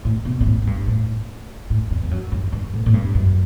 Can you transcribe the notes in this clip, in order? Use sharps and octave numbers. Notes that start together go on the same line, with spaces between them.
A2
B2
B2
A2
A2
G2
A2
A2
E2
G2
F#2
F#2
G2
A2
A2
G2
F#2